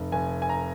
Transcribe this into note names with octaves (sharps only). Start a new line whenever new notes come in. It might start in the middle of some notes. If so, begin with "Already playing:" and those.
Already playing: F1
F1 G#5
G#5
A#5